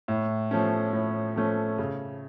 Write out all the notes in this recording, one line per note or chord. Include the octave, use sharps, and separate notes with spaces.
A2
F3 A3 C#4
A2
F3 A3 C#4
C#3